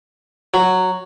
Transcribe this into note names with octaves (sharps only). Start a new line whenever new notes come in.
F#3